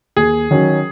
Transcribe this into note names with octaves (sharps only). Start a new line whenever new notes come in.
D#2 G#4
D#3 F#3 C#4